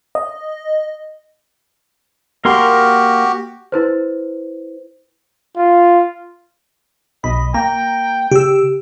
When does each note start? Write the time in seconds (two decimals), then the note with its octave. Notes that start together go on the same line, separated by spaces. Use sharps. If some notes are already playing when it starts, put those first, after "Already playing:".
0.15 D#5
2.45 A#3 F#4 G4 A#4 C6
3.72 E4 B4 C5
5.57 F4
7.24 B1 D#5 B5
7.54 A#3 G5 A#5
8.31 C#3 G4 E6